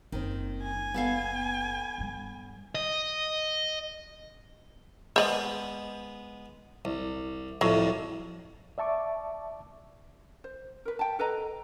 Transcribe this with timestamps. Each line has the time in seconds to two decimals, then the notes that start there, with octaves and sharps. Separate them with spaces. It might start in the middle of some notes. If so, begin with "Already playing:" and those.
0.12 F#1 C#2 D#3 C4
0.62 G#5
0.94 B3 A4 F5
1.98 G2 G3
2.75 D#5
5.16 G#3 B3 C5 D5 D#5
6.85 C2
7.61 C2 F2 A2 F#3
8.78 D5 E5 A5 C#6 D6
10.44 C5
10.85 A#4 B4
10.99 G5 A5
11.19 A4 B4 D#5 A#5